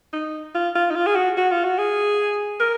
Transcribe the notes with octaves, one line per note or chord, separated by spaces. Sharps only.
D#4
F4
F4
D#4
F4
G#4
F#4
F#4
F4
F#4
G#4
A#4